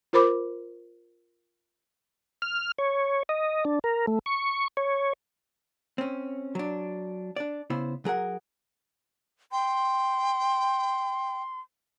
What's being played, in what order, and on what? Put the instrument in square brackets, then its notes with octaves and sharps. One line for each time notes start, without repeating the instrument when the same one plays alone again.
[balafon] F4 A#4 C5 B5 D6
[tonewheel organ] F6
C#5
D#5
D4
A#4
A3
C#6
C#5
[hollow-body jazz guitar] C4 C#4
F#3 D4
D4 D5
C#3 B3 E4 C5
F#3 G#4 A#4 F#5
[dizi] G5 [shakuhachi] C6